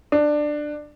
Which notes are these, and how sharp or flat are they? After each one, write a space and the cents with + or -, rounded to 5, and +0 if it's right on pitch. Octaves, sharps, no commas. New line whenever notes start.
D4 +15